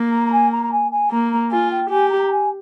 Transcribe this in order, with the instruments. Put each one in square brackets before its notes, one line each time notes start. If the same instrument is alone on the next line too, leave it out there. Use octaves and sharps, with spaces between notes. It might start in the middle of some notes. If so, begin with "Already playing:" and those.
Already playing: [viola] A#3
[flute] A#5
A#5
G#5
A#5
A#5
G#5
G#5
[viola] A#3 [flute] A#5
[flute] A#5
[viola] F4 [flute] G#5
[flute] G5
[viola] G4 [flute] G#5
[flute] A#5
A#5
G#5